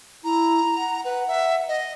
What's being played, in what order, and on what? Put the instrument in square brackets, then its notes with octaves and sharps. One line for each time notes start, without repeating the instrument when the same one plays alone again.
[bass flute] E4 [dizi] A#5
[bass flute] F#5
[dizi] B4 [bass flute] F#5
[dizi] E5
D#5